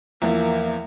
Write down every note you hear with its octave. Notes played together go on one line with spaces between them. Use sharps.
E2 F3 A#3 E5